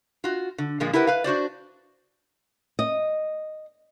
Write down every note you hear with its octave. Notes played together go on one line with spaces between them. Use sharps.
F4 F#4
D3
A#2 D3 F3 G#3 A#3
E4 G4 A#4 B4 F#5
B4 F5
D4 F#4 C5 D5
D#5